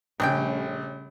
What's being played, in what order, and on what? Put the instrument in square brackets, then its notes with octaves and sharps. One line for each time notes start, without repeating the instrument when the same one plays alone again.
[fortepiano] A#1 [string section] C#3 G3 A3 [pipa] C4 C#4 G5